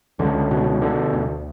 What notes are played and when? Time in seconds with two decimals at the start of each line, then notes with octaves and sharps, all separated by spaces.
0.19 C#2 D3
0.51 B2
0.82 D3
1.13 D2